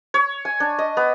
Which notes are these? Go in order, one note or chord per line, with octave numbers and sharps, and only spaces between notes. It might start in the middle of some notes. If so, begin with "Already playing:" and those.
C#5
G#5
D4
D#5
B3